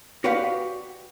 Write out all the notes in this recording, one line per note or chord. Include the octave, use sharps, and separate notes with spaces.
F#4 G4 B4 D5 F5 F#5